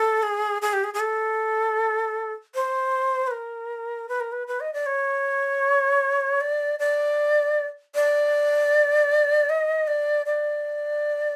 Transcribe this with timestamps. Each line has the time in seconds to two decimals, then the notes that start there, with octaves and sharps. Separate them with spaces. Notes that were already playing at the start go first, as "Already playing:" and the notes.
Already playing: A4
0.22 G#4
0.62 G#4
0.73 G4
0.84 G#4
0.94 G#4
1.00 A4
2.55 C5
3.27 B4
3.31 A#4
4.09 B4
4.20 A#4
4.32 B4
4.47 B4
4.60 D#5
4.73 D5
4.86 C#5
6.41 D5
6.79 D5
7.95 D5
9.49 D#5
9.87 D5
10.26 D5